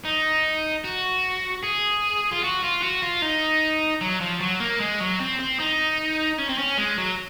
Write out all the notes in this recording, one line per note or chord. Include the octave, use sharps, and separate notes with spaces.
D#4
F#4
G#4
F4
F#4
F4
F#4
F4
D#4
F#3
F3
F#3
A#3
G#3
F#3
C4
C4
D#4
C#4
C4
C#4
G#3
F#3